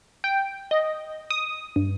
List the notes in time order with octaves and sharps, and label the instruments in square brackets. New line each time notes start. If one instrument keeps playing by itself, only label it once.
[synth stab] G5
D#5
D#6
G2